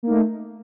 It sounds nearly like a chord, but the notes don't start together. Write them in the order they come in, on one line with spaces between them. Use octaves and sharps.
A#3 D#4 A3